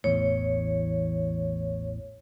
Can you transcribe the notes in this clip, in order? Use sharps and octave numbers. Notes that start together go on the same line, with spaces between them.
A1 E2 A2 C#5